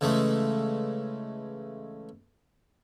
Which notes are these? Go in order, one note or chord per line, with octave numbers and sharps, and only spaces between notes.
C#3 E3 G#3 A3